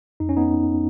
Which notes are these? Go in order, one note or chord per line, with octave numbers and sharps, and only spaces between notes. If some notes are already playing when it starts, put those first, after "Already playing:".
F2 D#4
C#4
B3 D#4